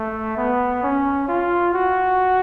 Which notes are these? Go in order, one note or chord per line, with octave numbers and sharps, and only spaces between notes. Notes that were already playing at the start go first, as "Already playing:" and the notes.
Already playing: A3
B3
C#4
F4
F#4